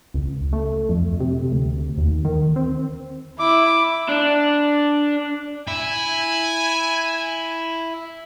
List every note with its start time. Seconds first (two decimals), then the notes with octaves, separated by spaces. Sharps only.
0.14 C#2
0.53 A3
0.89 F2
1.20 C3
1.51 D2
1.97 D#2
2.25 D#3
2.56 C4
3.39 E4 D6
4.09 D4
5.68 E4 G#5